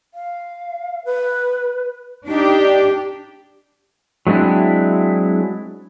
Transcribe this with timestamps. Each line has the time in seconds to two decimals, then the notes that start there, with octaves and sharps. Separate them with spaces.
0.14 F5
1.05 B4
2.27 D4 D#4 G4
4.27 F#3 G#3 C4 D4 E4